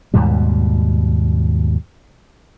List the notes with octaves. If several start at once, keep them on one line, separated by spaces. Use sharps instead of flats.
D#2 G#2 B2 G3